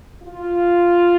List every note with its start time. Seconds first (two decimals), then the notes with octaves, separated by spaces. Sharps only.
0.22 F4